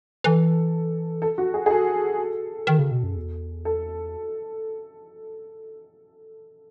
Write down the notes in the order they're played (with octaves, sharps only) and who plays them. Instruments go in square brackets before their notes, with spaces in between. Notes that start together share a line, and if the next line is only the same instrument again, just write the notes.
[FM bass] E3 [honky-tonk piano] A4
[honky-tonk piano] A4
F#4
G#4
G#4
A4
[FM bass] D#3
C#3
B2
F#2
E2
[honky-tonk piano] A4